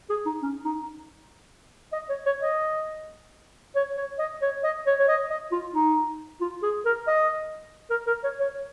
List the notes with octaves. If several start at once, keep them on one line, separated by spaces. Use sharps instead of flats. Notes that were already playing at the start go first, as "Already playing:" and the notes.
G#4
D#4
C#4
D#4
D#5
C#5
C#5
D#5
C#5
C#5
D#5
C#5
D#5
C#5
C#5
D#5
D#5
F4
D#4
F4
G#4
A#4
D#5
A#4
A#4
C#5
C#5